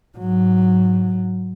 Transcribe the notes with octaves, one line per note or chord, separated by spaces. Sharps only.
G#2 F#3